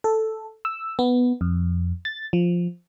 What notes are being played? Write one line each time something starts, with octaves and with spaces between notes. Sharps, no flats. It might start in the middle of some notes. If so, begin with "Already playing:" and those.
A4
E6
B3
F2
A6
F3